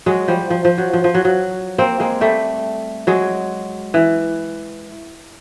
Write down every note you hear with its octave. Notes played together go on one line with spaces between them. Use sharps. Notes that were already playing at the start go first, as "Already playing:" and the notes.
F#3 G#3
F3 G3
F3
F3
F#3
F3
F3
F#3
F#3
A#3 C4
G#3 A#3
G3 A3
F#3 G#3
E3